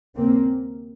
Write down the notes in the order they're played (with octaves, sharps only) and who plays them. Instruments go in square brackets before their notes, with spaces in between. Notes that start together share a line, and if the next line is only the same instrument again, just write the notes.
[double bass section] D#2 C#3 A#3 C4